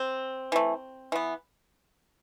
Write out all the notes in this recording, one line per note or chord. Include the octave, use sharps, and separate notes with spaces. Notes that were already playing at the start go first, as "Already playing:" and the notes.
Already playing: C4
E3 A3
E3 B3